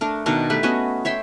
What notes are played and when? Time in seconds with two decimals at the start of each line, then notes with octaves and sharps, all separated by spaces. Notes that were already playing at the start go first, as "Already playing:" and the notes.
0.01 A3 D4 A#4
0.26 B2 D#3 D4 A#4
0.50 A3 G4 B4
0.63 B3 C#4 F#4 D#5
1.05 C#5 E5 G5 C6